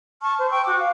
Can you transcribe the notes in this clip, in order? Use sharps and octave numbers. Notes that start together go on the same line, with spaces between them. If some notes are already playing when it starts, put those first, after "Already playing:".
A5 C#6 F6
C5
G5 C#6 E6
F#4 D6
F5